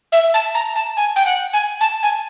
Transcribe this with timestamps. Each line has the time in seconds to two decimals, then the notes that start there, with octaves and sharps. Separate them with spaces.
0.12 E5
0.34 A5
0.54 A#5
0.75 A5
0.97 G#5
1.16 G5
1.25 F#5
1.53 G#5
1.80 A5
2.02 G#5